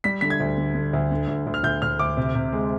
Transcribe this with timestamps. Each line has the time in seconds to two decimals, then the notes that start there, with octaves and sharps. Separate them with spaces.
0.04 G3 B6
0.21 D3 B6
0.30 G#6
0.40 D2
0.58 D3
0.75 D3
0.93 D2
1.11 D3
1.28 D2
1.47 D2
1.54 F6
1.63 D2 G6
1.82 D2 F6
1.99 D2 D6
2.17 C3
2.35 C3
2.53 G#3